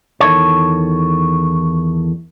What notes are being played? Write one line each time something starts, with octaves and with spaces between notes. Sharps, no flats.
E2 D#3 A4 C#5